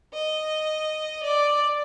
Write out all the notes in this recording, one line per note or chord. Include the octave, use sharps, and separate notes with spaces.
D#5
D5